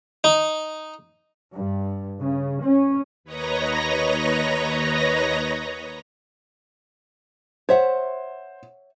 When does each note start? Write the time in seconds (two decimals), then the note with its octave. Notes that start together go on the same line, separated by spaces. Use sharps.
0.24 D#4
1.56 G2
2.20 C#3
2.63 C#4
3.24 D#2 B4 C#5 D#5 A#5 A#6
7.69 C5 C#5 E5 F#5